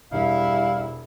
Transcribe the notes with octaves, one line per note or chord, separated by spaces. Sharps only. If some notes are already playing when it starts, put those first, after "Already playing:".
E1 G3 E4 F5